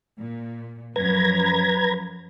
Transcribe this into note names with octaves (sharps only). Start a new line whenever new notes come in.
A#2
F#2 F3 B4 A#5 G#6